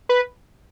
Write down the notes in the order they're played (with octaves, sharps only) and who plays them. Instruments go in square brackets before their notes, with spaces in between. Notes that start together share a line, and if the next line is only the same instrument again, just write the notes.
[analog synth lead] B4